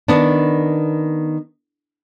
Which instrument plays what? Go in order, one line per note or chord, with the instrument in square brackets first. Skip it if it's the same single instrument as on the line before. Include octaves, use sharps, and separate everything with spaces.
[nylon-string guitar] D#3 B3 D4